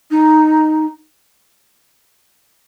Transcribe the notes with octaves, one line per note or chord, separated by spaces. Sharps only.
D#4